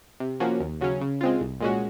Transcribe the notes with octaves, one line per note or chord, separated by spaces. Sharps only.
C3
F3 A#3 C#4 F#4
D#2
C#3 F#3 C#4
C#3
G#3 C4 F4
C2
A#2 G#3 C#4 F#4